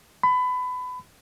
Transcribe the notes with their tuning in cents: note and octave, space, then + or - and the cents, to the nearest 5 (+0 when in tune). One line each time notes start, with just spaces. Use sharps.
B5 +25